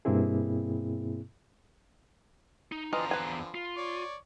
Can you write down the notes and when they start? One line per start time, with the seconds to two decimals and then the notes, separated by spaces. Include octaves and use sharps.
0.05 G2 B2 A#3 C4 E4 G#4
2.72 D#4
2.93 E2 D3 E3 F3 C4 F4 D#5 A#5
3.11 B4 G#5
3.55 F4
3.77 C#5 D5